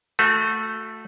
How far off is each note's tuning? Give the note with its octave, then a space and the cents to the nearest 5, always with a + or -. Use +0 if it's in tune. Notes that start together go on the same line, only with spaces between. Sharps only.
A3 +0 F#4 -30